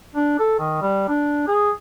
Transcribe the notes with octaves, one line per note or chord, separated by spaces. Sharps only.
D4
A4
D#3
G3
D4
G#4